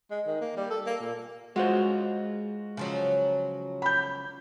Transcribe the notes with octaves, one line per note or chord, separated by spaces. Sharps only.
G#3
D#3
A#3
G3
A4
A#3
A#2
G#3 F4 F#4 C5
C#3 F3 F#3
B5 G6